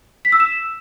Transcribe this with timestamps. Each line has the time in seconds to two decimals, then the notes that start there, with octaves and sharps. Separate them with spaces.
0.25 B6
0.32 E6
0.40 E7